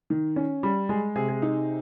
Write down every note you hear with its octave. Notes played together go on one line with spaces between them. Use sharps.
D#3
C#4
G3
G#3 G#4
C3 G#4
G#4
D#4